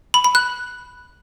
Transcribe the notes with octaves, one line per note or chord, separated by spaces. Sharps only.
B5
B5
F#6